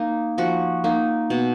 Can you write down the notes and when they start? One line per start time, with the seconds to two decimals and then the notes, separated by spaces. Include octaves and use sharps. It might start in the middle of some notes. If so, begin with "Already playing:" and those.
Already playing: A#3 D#4
0.38 F3 F#4
0.84 A#3 D#4
1.30 B2